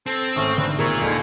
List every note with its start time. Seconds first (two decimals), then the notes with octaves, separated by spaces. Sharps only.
0.06 C4 A4
0.36 G#1 A3 C#4 D#6
0.58 D3 B4
0.78 A#2 G#4 A#4 C#5 C#6 D#6 E6
1.01 D#2 D4 A4 C5 D#5 G#6